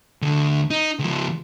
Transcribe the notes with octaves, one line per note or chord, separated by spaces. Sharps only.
D2 D3
D#4
C#2 F3